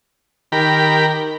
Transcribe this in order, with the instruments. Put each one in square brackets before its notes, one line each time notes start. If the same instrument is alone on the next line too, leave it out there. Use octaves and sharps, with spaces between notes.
[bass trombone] D#3 [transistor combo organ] G4 A#4 B5